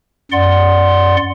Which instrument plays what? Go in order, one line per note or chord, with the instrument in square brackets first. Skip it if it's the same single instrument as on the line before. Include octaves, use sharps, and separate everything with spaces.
[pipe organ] F#2 D5 F#5 C6